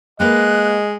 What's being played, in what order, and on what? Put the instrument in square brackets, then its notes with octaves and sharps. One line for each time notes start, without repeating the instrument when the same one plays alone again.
[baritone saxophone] G#3 [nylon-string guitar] A#3 A#4 B4 [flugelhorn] D#5 [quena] F#6